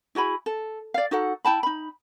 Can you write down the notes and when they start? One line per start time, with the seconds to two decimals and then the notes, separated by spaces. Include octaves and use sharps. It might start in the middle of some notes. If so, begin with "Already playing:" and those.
0.15 E4 F#4 G#4 B5
0.46 A4
0.94 D5 F5
1.11 D#4 F#4 A4 F#5
1.45 E4 G5 A5 B5
1.63 D#4 B5